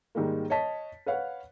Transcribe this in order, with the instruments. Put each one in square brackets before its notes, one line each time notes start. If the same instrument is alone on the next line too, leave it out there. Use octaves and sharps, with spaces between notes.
[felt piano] G#2 D#3 G3 G#3 A#3
C#5 D#5 A5 B6
B4 C#5 F5 F#5